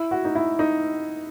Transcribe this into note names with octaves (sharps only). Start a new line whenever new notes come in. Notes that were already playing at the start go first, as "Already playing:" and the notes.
Already playing: E4
F#4
D#4
E4
D#4